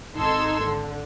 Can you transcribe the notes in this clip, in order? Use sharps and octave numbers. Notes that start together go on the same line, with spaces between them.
G#1 D#4 A4 C6 E6 G#6
D3